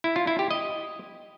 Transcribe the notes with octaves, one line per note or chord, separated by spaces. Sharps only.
E4
F4
E4
G4
D#5